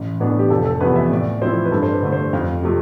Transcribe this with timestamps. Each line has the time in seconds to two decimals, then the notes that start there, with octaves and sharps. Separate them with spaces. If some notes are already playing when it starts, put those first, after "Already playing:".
Already playing: A1
0.20 A2 E3 B3 D4
0.39 G4
0.50 F1 A4
0.65 A4
0.81 E2 C3 F3 B3 B4
0.95 E5
1.10 A2 D5
1.42 F3 C4 E4 C5
1.65 B4
1.72 G2 A4
1.83 C5
1.92 B4
2.02 D3 A3
2.12 C5
2.33 F2 F5
2.63 C3 F3 A3